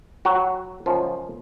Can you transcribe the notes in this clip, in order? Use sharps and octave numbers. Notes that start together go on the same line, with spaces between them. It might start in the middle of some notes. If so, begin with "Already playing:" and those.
F#3 F#4
F#2 C#3 F3 G#3 F4